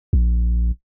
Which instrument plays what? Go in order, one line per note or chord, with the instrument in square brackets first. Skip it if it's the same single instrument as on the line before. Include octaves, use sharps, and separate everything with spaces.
[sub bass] A#1